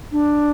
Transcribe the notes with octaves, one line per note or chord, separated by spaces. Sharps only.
D4